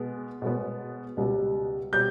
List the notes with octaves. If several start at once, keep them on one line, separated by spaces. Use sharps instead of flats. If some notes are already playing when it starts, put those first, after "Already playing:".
Already playing: B2 G#3 B3
B2 G#3 B3
C#2 B2 G3
B2 G3 G6